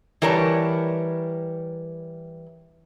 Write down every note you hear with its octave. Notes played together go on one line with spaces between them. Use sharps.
E3 G3 A#4 B4 C#5 A5